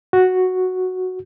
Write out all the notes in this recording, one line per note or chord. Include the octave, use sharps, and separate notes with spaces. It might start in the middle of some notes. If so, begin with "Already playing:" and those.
F#4